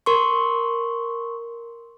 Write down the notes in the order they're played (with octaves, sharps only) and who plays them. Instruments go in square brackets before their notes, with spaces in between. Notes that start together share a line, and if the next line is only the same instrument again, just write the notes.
[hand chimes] A#4 C6 C#6